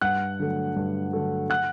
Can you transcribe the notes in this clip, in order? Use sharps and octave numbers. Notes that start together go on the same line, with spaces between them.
G2 F#5 F#6
D3 F#3 A3
G2
D3 F#3 A3
F#5 F#6